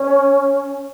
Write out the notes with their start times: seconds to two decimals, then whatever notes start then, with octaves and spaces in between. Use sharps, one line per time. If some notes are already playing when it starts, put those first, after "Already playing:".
Already playing: C#4